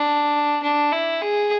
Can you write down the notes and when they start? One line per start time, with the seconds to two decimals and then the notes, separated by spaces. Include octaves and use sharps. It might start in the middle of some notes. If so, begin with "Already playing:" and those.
Already playing: D4
0.63 D4
0.92 E4
1.22 G#4